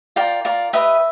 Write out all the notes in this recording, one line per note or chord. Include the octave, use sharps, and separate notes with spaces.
F4 A#4 D5 G5
F4 A#4 D5
G4 B4 D#5 E5